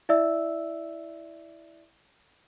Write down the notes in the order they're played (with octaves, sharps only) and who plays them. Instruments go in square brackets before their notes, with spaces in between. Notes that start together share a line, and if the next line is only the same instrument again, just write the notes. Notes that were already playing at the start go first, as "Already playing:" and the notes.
[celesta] E4 D5 E5 E6